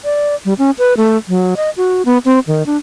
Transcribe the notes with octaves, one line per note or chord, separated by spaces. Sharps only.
D5
G3
C#4
B4
A3
F#3
D#5
F#4
B3
C4
D#3
D4